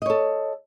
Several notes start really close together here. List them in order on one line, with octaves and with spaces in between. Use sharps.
D#5 C#5 A4